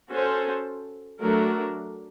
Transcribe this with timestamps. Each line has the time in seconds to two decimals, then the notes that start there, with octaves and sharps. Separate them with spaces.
0.11 C#4 F#4 A4 C5
1.21 F#3 A3 D4 F#4 A#4